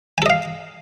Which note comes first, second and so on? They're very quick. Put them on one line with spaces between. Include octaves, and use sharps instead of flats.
G#5 A4 D#5 F5